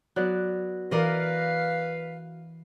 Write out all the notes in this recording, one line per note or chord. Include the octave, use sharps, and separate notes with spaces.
F#3 B3 D5 F#6
E3 A#4 B4 D5 D#5 F5